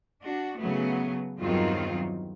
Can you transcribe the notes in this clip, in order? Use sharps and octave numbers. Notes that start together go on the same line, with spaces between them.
D4 F#4
C#3 F#3 A3 B3
E2 G2 D#3 F#3 C4 F4